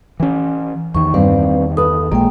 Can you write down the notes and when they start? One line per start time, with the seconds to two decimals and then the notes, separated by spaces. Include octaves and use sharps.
0.20 E3 C#4
0.95 E2 D#3 C#6
1.14 G2 C4 B4 D5 F5
1.77 A4 B4 D#6
2.12 A#1 G#3 A#3 G5